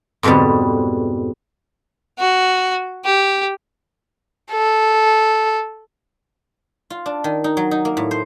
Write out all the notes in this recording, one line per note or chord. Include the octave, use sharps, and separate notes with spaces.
F2 G#2 B2 D3 G3
F#4
G4
A4
F4
D4
D#3
D#4
F#3
D#4
A#3
A2
C5